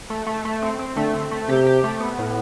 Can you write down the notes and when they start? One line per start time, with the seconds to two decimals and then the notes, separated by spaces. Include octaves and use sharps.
0.10 A3
0.27 A3
0.45 A3
0.62 C4
0.79 C4
0.97 D3 A3
1.13 C4
1.31 A3
1.49 C3 G4
1.67 G4
1.84 A3
2.00 B3
2.19 A2